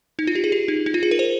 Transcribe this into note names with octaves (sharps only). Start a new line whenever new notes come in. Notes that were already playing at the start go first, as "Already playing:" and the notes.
D#4
F4
G4
G#4
G4
D#4
D#4
F4
G#4
A#4
C5